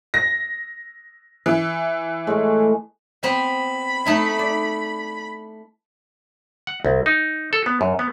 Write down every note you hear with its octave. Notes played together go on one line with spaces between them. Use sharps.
A#6
E3
A2 G#3 A3
B3 C4 B5
A3 D#4 E4
D5
F#5
C2
D#4
A4
B3
F#2
B3